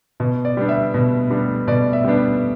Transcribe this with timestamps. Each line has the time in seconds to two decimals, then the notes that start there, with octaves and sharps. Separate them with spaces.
0.20 B2
0.45 D5
0.57 G3 B3 D4
0.69 E5
0.94 B2
1.30 G3 B3 D4
1.67 B2 D5
1.93 E5
2.04 G3 B3 D4